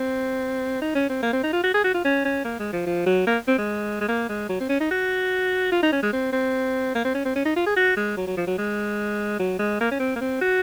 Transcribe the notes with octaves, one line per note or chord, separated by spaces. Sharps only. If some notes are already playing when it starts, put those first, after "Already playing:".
Already playing: C4
D#4
C#4
C4
A#3
C4
D#4
F4
F#4
G#4
F#4
F4
C#4
C#4
A#3
G#3
F3
F3
F#3
A#3
C4
G#3
G#3
A#3
G#3
F#3
C4
C#4
D#4
F#4
F4
D#4
C#4
G#3
C4
C4
A#3
C4
C#4
C4
C#4
D#4
F4
G#4
F#4
G#3
F#3
F#3
F3
F#3
G#3
F#3
G#3
A#3
C#4
C4
A#3
C4
F#4